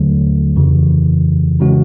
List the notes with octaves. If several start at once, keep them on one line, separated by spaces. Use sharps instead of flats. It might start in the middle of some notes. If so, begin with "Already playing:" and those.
Already playing: D#2 D3 F#3 A3
F2 C#3 E3
C#3 E3 G#3 C#4 F#4